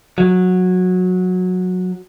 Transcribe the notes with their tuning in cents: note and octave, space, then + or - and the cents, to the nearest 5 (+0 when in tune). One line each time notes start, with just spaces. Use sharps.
F#3 -15